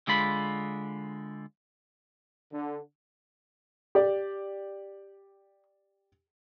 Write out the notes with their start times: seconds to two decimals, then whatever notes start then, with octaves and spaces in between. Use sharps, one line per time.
0.07 D3 G#3 F4 B5
2.52 D3
3.95 G4 D5